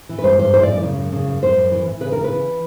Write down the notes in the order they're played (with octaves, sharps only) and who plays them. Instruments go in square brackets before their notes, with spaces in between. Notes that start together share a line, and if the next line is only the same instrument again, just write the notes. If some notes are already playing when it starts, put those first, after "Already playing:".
[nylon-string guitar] E3
B4
G2 C5
G2 C5
E3 C5
D5
F#2
D5
C#3
F#2
C#3
F#2
F#2 C5
F#2
E3
E3
C#3 B4
C#3 A#4
B4
E3